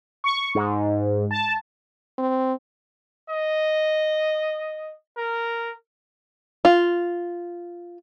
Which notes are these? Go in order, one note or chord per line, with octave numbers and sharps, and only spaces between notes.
C#6
G#2
A5
C4
D#5
A#4
F4